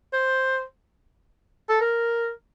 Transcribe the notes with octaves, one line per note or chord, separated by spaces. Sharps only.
C5
A4
A#4